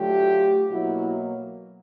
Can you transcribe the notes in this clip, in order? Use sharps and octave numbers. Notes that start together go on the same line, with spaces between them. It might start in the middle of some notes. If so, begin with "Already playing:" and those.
Already playing: D3 F#3 A3 F4 G4
B2 F#3 A#3 E4 F#4